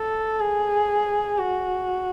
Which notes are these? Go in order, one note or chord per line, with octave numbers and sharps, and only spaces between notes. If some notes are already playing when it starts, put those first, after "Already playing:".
Already playing: A4
G#4
F#4